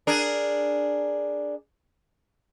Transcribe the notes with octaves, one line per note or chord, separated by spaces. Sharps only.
D4 G#4 A#4